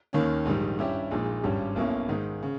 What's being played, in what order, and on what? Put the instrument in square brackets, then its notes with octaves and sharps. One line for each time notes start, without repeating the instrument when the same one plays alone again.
[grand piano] D#2 D#3 A#3 C#4
A#1 G#2 D#3 G3
G2 G3 C#4 E4 G4
A#1 A#2 G#3 D#4
G#1 G2 G3 C#4 G4
B1 B2 A#3 C#4 E4
G#2 D#3 G#3
C#3